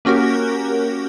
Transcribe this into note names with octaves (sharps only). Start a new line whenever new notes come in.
A#3 C#4 F#4 G4 A#4